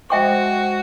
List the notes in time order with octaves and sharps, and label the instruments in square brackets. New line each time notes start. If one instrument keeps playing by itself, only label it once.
[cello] G#3 [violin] F#4 [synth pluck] C5 D#5 G#5 [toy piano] E5 G5 C#6